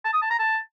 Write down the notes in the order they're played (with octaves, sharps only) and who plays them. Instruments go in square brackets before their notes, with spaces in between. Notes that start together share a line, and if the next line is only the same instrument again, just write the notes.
[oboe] A5
D#6
A5
A#5
A5